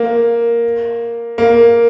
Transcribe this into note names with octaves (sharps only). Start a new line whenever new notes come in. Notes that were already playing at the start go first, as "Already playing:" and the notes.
Already playing: A#3
A#3